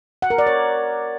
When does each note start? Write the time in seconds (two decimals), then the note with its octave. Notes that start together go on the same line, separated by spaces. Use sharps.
0.22 F#5
0.30 A#4
0.38 D5
0.47 C#5